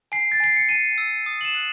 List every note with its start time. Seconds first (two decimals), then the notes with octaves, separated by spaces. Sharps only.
0.12 G#5 C7
0.32 A6
0.40 G#5 C7
0.56 C#7
0.69 G#5 D#7
0.98 E6
1.26 D#6
1.41 F#7
1.45 E7
1.54 F#6